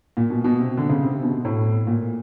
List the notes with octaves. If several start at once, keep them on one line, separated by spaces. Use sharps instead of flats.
A#2
B2
B2
C3
D3
C#3
C3
C3
B2
A2
A#2